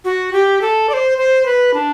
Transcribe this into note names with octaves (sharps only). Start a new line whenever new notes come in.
F#4
G4
A4
D5
C5
C5
B4
D4